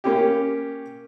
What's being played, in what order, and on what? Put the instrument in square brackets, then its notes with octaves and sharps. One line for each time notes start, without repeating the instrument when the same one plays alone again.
[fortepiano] A#3 C#4 G4